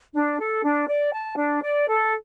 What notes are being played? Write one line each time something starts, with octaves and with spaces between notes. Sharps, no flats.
D4
A4
D4
D5
A5
D4
D5
A4